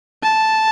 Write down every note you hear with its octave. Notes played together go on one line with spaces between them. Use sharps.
A5